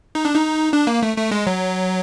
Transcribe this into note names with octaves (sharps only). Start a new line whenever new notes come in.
D#4
D4
D#4
D4
A#3
A3
A3
G#3
F#3